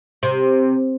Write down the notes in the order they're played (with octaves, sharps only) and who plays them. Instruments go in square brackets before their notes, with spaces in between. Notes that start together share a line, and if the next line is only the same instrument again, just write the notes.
[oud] C3